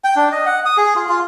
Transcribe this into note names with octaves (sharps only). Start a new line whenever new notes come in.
G5
D4
D#5
F#5
D#6
G#4
F4
F4